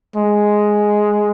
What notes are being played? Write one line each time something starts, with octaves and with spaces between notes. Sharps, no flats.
G#3